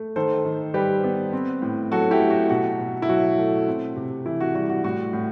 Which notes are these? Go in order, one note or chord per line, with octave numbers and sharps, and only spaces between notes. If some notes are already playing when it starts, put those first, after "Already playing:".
Already playing: A3
D#3 A4 C5
D#3
G3 G4 B4
B3
C4
A2
F#3 F#4 A4
E4 G4
A3
F#4
B2 F#4
B2
E4
F#3 F#4
A3
C4
C3
E3 E4
F#4
G3 F#4
F#4
A2 F#4
A2